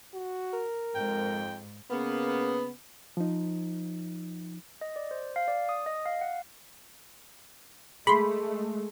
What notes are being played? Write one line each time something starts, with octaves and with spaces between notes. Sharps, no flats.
F#4
A#4
F2 G#2 G5
C#3 A#3 B3
F3 D#4
D#5
D5
C5
F5
D5
D#6
D#5
F5
F#5
G#3 A3 G#4 B5 C6